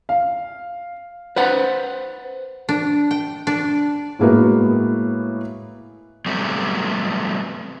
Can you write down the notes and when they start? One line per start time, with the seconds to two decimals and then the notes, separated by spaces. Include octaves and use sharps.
0.09 F5
1.36 B4 C5 F#5
2.69 D4
3.11 G5
3.47 D4
4.19 A2 G#3 A#3 B3 E4 F#4
6.26 F#3 G3 A3 B3 C4